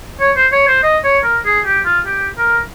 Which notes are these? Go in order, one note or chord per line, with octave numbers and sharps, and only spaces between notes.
C#5
C5
C#5
C5
D#5
C#5
A#4
G#4
G4
F4
G4
A#4